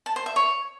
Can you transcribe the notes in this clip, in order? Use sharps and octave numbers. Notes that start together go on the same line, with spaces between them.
A5
C5
E5
C#5